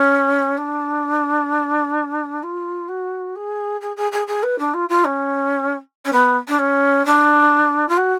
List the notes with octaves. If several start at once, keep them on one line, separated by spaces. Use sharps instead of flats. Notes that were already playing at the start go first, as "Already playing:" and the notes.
Already playing: C#4
D4
F4
F#4
G#4
G#4
G#4
G#4
G#4
B4
D4
F4
F4
C#4
C#4
B3
D4
C#4
D4
F4
F#4